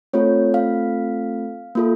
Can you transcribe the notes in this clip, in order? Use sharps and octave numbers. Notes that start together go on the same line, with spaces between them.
A3 C4 F4 A4 C#5
F5
A#3 F4 A4